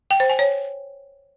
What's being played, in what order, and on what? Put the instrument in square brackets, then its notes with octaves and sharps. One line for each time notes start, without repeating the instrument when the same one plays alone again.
[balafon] G5
C5
G#5
C#5